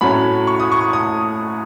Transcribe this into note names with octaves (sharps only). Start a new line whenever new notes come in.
A2 F#3 A3 C#4 B5
C#6
D#6
C#6
D#6